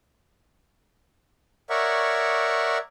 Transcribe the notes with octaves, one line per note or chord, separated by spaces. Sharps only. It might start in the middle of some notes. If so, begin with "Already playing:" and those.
A#4 C#5 D5 E5 F#5 C#6